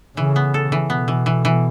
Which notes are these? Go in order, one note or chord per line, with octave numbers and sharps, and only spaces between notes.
C#3 E3
B3
A4
E3
B2 B3
E3
E3
E3